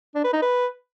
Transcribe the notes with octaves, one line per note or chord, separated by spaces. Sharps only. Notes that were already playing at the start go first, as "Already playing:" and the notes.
D4
B4
D#4
B4